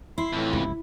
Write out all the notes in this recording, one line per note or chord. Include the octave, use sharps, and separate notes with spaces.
E4 C6
F2 A2 E3
C#2 G2 C3